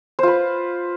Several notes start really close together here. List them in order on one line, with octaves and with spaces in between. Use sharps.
C5 F4 B4